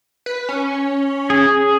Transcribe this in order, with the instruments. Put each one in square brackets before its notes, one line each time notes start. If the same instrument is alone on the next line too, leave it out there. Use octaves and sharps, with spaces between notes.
[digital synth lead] B4
C#4
[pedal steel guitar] G#4